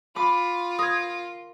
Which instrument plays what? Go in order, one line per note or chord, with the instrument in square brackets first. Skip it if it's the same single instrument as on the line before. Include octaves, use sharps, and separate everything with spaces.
[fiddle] F4 [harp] B5 D6
[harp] A#4 [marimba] D#6 G#6